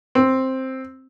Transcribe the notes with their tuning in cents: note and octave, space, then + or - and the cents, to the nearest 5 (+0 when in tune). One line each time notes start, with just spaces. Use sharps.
C4 +5